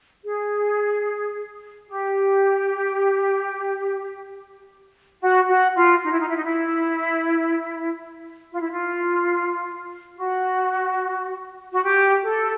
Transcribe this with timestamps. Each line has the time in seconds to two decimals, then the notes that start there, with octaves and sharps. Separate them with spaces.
0.24 G#4
1.89 G4
5.21 F#4
5.48 F#4
5.75 F4
6.04 D#4
6.12 E4
6.20 D#4
6.28 E4
6.36 D#4
6.45 E4
8.52 F4
8.61 E4
8.70 F4
10.17 F#4
11.72 F#4
11.83 G4
12.25 A4